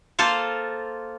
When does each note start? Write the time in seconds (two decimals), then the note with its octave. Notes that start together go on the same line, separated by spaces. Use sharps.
0.19 A#3 F4 A4 C5 F5